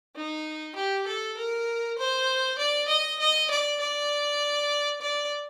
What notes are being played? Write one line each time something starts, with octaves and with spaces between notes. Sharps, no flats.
D#4
G4
A4
A#4
C5
D5
D#5
D#5
D5
D5
D5